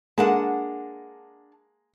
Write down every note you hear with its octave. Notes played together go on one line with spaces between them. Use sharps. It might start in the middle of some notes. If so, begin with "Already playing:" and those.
G#3 A#3 D4 F#5 A5